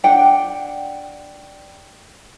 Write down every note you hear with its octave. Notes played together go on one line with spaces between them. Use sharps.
D4 F#5 G5